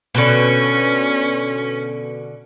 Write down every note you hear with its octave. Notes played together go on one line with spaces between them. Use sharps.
B2 D3 C#4